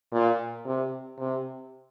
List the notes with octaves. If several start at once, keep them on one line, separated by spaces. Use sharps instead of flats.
A#2
C3
C3